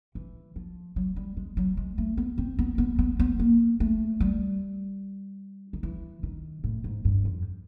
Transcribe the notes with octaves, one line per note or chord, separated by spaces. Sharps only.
E3
F3
F#3
G3
G#3
F#3
G#3
A3
B3
C4
B3
B3
B3
B3
A#3
A3
G3
D#3
E3
D#3
A2
G#2
G2
F2